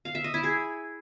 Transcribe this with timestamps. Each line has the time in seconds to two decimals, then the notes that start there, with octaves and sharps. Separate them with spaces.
0.05 F5
0.15 E5
0.24 D#5
0.34 E4
0.43 G#4